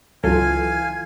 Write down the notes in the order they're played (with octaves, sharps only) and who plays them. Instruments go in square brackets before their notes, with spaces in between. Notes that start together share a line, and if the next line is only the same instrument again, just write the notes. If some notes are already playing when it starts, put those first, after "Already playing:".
[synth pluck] C#2 F#3 A4 [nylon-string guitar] E3 F4 [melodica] F5 G#5 [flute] G#6